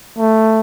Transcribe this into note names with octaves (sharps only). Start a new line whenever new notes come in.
A3